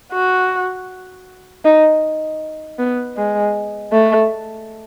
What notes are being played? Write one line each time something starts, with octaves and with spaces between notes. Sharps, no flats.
F#4
D#4
B3
G#3
A3